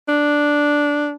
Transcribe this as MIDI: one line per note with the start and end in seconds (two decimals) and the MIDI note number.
0.09 1.14 62